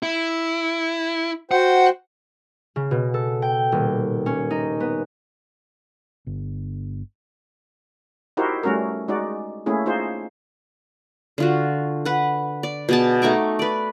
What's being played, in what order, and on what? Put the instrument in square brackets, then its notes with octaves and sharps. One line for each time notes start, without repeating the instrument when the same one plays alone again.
[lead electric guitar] E4
[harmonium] F#4 C5 G5 [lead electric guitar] F#5
[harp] C#3
B2
A4
G5
D#1
C#4
D#4
B3
[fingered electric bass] G1
[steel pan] D#4 E4 F#4 G4 A#4 C5
G3 A3 C#4 F#4 A#4
G#3 D#4 F#4 D5
A3 A#3 C#4 E4 G#4
D#4 F4 G#4 C5
[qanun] D3 F4 F#4
B4 F#5
D5
B2 G#4 A5
A3 D#4 C#6 D6
B4 D5